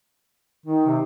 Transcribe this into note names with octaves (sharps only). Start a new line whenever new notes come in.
D#3 D#4
C3